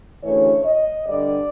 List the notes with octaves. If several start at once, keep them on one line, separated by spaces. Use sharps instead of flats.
D2 C#3 E3 A3 C#5
D#5
G2 D3 G3 D5